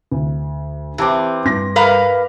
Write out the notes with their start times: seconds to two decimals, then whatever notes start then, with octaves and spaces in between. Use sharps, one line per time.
0.12 D2
0.98 E3 C4 G4 A5 D6
1.45 G2 C6 A#6
1.76 A#4 B4 F5